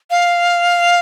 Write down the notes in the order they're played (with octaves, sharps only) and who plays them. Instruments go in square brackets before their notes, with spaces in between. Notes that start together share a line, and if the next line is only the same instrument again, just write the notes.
[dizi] F5